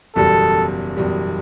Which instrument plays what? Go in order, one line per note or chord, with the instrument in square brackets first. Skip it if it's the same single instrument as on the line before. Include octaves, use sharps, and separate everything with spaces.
[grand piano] F#1 E2 B2 G3 [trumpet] A4
[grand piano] F#1 E2 B2 G3